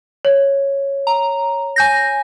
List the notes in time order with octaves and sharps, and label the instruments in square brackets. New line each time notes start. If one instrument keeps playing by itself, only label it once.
[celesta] C#5
[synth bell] A#5
G#5 G6 A#6